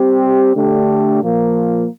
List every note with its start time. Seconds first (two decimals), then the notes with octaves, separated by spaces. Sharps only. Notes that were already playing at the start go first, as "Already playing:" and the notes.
Already playing: G3 C4 G4
0.55 D3 A3 D4 G4
1.21 A#2 F3 A#3